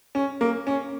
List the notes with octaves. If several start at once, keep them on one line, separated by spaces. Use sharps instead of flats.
C#4
A#3
C#4